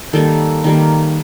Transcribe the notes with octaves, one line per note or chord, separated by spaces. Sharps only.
D#3 G3 A#3 A4
D#3 G3 A#3